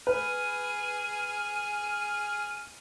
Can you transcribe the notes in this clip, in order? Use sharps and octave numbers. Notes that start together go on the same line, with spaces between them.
G#4 B4 F6 D#7